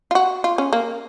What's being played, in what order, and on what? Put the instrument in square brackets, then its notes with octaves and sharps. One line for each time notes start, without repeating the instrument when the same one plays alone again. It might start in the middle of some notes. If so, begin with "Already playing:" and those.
[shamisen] F4
F#4
F4
C#4
A#3